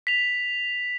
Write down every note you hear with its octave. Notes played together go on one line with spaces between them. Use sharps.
B6 F7